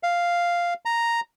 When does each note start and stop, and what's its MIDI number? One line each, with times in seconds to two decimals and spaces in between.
0.03 0.74 77
0.85 1.20 82